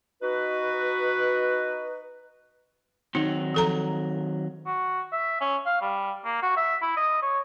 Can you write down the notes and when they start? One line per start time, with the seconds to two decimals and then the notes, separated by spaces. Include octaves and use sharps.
0.22 D#4 F#4 B4
3.15 D#3 F#3 C4 D#4
3.54 F3 A4 A#5
4.66 F#4
5.12 E5
5.41 C#4
5.66 F5
5.81 G3
6.25 A#3
6.42 F#4
6.57 E5
6.82 E4
6.97 D#5
7.22 C#5